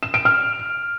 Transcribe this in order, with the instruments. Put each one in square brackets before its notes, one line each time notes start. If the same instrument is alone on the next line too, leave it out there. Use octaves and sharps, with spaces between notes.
[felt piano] E7
D7
F6